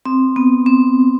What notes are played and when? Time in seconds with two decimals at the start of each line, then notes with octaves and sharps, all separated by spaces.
0.05 C4
0.36 B3
0.66 C4